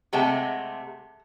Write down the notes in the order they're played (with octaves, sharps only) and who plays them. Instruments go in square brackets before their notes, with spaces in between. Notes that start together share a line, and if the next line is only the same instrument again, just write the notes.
[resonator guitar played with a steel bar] C3 G#3 A3 [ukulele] F#5 G5 A5